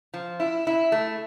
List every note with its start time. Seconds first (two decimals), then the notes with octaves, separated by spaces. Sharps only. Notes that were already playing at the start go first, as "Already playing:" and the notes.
0.14 F3
0.40 E4
0.67 E4
0.92 A3